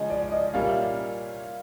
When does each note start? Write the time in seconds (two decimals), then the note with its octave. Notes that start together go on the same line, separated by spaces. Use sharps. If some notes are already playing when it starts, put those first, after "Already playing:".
Already playing: C#3 F3 G#3 C#4 D#5
0.10 D5
0.22 D5
0.32 D#5
0.53 A#2 G3 A#3 C#4 F5
0.68 E5